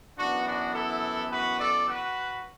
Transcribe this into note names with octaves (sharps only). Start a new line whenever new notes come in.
F#2 E3 B3 D4 F#4
D4 F#4
E4 A4
F#4 B4
A4 D5
F#4 B4